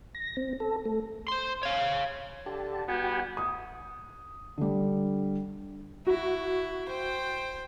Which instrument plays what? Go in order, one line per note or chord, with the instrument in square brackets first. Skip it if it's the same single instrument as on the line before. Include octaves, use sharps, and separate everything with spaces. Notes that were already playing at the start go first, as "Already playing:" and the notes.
[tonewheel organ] A#6
C4
A4
A3
[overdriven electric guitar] C5 C6
C#5 F5
[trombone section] D3 [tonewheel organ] G4 A5
[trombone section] G3 B3 [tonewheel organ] F#4 G5 G#5
[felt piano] D#6
D3 G3
[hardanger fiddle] E4 [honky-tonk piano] F#4
[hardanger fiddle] C5 G5